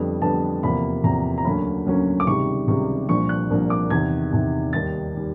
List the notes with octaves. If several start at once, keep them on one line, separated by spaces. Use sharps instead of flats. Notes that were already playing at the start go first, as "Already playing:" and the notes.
Already playing: F2 D3 G3 B3
F2 D3 G3 B3 A5
E2 C3 F3 A#3 B5
E2 C3 F3 A#3 A#5
A#5
D2 C#3 F#3 A#3 C#4 B5
D2 C#3 F#3 A#3 C#4
D6
C#2 C3 D#3 G3 C#6
C#2 C3 D#3 G3 C#6
C2 A#2 F3 A#3 D4 C#6
F#6
C2 A#2 F3 A#3 D4
D6
E2 C3 D#3 G#6
E2 C3 D#3
D#2 D#3 G3 A6
D#3 G3